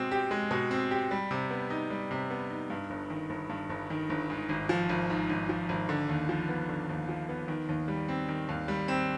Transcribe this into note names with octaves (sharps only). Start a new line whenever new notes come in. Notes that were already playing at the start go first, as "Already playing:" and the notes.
Already playing: B2 G#3 C4
G4
G#3
B2
C4
G4
G3
C3
B3
D#4
G3
C3
B3
D#4
G2
G1
D#3
G1
G2
G1
D#3
G1
G#2
G#1
F3
G#1
G#2
G#1
F3
G#1
D3
D#2
F3
B3
D3
D#2
F3
B3
D#3
D#2
G3
C4
D#3
D#2
G3
C4